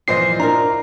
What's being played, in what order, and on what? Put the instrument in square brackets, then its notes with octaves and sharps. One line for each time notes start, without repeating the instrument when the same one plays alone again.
[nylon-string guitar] G2 E3 F3 [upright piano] A#2 C5 D#5 [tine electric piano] C7
[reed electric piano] D4 [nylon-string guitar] E4 A#4 [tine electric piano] A#5